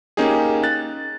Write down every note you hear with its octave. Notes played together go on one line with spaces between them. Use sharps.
A#3 C#4 D#4 G4 G#4
F#6 A6